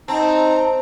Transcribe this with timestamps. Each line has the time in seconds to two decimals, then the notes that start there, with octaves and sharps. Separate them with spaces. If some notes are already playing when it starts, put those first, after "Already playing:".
0.08 C4 D#4 A5 A#5